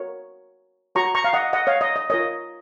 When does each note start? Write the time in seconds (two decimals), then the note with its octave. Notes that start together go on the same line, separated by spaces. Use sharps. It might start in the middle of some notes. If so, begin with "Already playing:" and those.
Already playing: F#4 A#4 C#5
0.95 F#4 C#5 A#5 C#6
1.15 A#5 C#6
1.24 F5
1.33 D#5 F#5
1.53 D#5 F#5
1.67 C#5 F5
1.81 D#5
1.96 D#5
2.10 F4 A#4 C#5 D#5